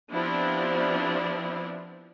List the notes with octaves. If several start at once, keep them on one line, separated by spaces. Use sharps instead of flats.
F3 B3 C4 D4 E4 G4